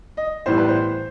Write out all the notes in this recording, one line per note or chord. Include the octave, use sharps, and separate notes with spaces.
D#5
A2 E3 G3 B3 C5
B4
C5